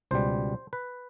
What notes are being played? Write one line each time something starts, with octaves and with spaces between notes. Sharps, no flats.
C#2 B2 G3 C5
B4